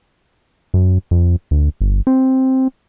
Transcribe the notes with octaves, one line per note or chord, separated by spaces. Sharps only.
F#2
F2
D2
G1
C4